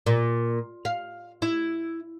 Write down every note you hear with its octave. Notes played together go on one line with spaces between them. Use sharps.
A#2
F5
E4